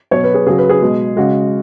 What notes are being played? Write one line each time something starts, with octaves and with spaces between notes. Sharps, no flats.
B2 F#3 C#5
B4
G#4
C#3 F#3 G#4
B4
G#4
B2 G#3
C#3 G#3 F#4